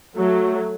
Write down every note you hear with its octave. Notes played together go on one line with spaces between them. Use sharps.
F#3 A3